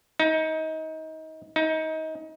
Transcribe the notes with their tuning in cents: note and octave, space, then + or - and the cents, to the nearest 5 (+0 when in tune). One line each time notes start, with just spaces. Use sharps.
D#4 +25
D#4 +25